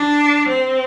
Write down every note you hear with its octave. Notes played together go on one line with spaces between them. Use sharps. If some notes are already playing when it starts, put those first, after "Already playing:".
Already playing: D4
C4